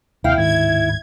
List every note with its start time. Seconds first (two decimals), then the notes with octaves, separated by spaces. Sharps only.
0.24 D#2 C3 E4 F5 G5
0.37 D1 G#2 D#3 G#6